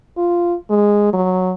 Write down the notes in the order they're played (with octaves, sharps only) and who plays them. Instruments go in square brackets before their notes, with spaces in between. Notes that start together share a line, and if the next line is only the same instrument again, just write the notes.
[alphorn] F4
G#3
F#3